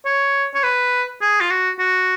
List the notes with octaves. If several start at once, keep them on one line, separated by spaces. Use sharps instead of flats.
C#5
C#5
B4
G#4
F4
F#4
F#4